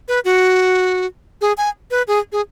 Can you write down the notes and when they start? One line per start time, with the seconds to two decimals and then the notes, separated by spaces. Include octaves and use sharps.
0.08 B4
0.25 F#4
1.41 G#4
1.58 G#5
1.91 B4
2.08 G#4
2.32 G#4